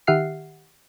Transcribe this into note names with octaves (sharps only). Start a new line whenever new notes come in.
D#3 G4 E5 F#5 F6 C7